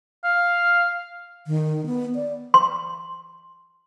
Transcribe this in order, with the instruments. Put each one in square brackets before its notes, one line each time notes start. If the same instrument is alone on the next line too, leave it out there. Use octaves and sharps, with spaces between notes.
[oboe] F5
[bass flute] D#3
B3
D5
[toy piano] C6